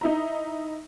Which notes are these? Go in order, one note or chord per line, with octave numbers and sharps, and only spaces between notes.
D#4 E4 A#5